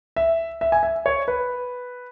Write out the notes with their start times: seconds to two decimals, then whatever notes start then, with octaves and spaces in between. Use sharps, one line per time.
0.16 E5
0.61 E5
0.72 G#5
0.83 E5
1.06 C#5
1.28 B4